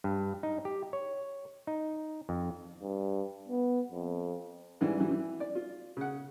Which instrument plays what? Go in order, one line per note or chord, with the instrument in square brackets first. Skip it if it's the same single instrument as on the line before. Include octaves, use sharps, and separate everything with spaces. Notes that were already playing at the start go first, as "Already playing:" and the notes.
[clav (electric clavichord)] G2
D#4
G4
C#5
D#4
F2
[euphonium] G2
B3
F2
[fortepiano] G#2 E3 G3
E3 F#3 G3
E3
D5
F4
C#3 F#5